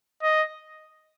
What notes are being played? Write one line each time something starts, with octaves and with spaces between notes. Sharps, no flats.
D#5